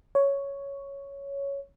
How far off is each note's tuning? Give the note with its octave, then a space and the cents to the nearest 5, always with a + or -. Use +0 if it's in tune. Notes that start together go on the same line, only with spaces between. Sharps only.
C#5 +5